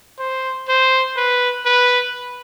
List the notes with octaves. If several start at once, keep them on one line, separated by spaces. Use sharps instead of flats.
C5
C5
B4
B4